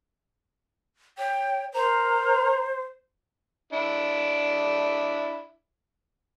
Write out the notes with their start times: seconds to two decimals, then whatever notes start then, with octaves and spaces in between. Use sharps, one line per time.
1.18 C#5 G5
1.74 A#4 C5 A#5
3.73 D4 E4